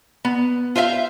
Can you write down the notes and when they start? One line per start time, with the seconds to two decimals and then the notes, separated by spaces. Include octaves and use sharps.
0.25 B3
0.76 F4 C5 E5 F5